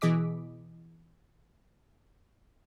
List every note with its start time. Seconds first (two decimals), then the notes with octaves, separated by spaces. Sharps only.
0.01 B2 E3 G#4 D#5 D6 B6